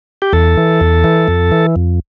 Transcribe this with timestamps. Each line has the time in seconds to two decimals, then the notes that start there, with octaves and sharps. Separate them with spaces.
0.22 G4
0.33 E2 A4
0.57 E3
0.81 E2
1.04 E3
1.28 F2
1.52 E3
1.76 F2